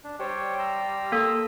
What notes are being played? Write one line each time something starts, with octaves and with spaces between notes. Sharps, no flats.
D4
G3 C5 C#5 G5
A#5 C6 E6
A#3 A4